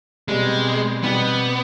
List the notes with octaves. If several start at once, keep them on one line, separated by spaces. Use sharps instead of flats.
B2 G3 G#3 C4 G4
B2 G3 B3 C4 G4